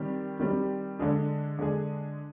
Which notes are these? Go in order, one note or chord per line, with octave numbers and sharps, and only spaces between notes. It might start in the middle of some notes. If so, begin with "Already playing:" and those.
Already playing: D#3 G3 C4 G4
D#3 G3 C4 G4
D3 G#3 D4 G#4
D3 G#3 D4 G#4